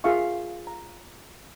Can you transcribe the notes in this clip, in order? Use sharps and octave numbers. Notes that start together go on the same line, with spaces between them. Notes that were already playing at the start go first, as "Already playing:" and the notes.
F4 G#4 A#4 E5 F5 C#6
A#5